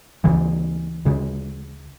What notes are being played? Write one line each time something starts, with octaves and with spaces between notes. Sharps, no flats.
D2 C#3 E3
D2 C#3